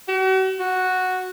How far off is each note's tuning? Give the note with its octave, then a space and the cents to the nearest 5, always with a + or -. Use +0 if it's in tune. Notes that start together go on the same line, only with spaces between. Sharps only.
F#4 +40
F#4 -5